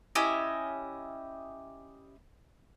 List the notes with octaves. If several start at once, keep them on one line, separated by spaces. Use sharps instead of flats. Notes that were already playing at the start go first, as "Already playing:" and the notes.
C#4 E4 G4 D#5